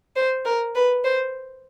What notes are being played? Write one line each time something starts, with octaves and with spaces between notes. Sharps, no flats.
C5
A#4
B4
C5